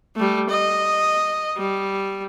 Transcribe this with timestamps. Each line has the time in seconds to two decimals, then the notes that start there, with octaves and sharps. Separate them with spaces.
0.16 G3 A3
0.49 D#5
1.56 G3